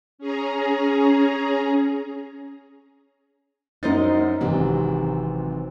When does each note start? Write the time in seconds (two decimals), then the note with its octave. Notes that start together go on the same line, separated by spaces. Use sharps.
0.18 C#4 G#4 A#5
3.83 F#2 D#4 C5 D#5 A6
4.41 G#1 C3 E3 F#3 C4